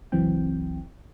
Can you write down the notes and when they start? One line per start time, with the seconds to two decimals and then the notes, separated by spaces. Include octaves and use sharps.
0.12 G1 C#2 E3 F#3 C4 G5